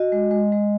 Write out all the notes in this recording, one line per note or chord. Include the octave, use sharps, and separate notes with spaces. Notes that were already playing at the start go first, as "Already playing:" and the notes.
Already playing: F#4 D#5
G#3
G#3
G#3